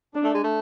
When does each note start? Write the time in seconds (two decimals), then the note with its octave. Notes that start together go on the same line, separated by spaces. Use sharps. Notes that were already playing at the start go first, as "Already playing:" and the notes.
0.14 D4
0.24 A3
0.35 G#3
0.44 A3